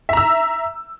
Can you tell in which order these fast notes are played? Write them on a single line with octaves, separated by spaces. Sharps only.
E5 A#5 E6